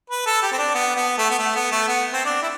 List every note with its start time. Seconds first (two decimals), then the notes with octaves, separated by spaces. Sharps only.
0.10 B4
0.26 A4
0.42 G4
0.52 C4
0.58 D4
0.74 B3
0.96 B3
1.18 A3
1.30 B3
1.39 A3
1.56 B3
1.72 A3
1.88 B3
2.13 C4
2.25 D4
2.42 E4